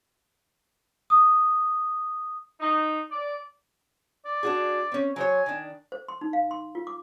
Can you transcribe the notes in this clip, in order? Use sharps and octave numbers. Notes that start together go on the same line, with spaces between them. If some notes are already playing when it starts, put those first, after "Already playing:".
D#6
D#4
D5
D5
D4 F#4 G#4
C4 C#4
F#3 C5 C#5 G#5
D#3 D4
C5
C6
D#4
F5
C6
F4
D6